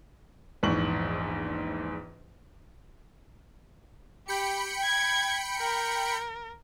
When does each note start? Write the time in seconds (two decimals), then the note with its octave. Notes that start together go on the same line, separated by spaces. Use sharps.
0.63 A#1 E2 G#2 C#6 F#7
4.28 G4 G5 B5 C#7
4.84 G#6
5.59 A#4